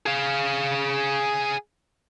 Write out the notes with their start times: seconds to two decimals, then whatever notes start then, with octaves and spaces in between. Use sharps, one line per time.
0.06 G#4 F5